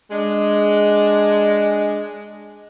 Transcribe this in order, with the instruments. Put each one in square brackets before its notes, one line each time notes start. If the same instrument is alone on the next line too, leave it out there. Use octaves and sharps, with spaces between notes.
[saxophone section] G#3 D4